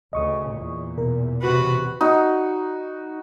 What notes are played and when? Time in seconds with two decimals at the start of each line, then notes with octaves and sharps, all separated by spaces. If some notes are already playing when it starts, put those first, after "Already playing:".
0.13 D2 C#3 D#5 C#6 D#6
0.53 E2 A#2
0.98 B2 A#4
1.41 C3 F#4 B4
2.01 D#4 F#4